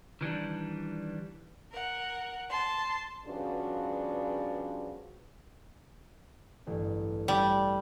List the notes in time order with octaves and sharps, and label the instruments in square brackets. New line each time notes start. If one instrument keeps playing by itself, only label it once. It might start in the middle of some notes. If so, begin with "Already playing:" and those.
[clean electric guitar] D#3 E3 G3 D4
[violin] A#4 F#5
A5 C6
[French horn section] G2 C#3 F3 B3 D4 F#4
[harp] A1 G2
[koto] G3